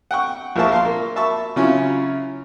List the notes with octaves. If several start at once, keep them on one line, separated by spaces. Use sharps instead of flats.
F#5 G5 C#6
A#1 F3 A#4 E5 A5 C#6
F5 C6
A#3
E5 A5 B5 C#6
C#3 F#3 C#4 E4 F4